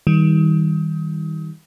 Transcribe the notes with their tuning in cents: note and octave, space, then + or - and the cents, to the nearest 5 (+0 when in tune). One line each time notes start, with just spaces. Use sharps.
D#3 +30 G3 +0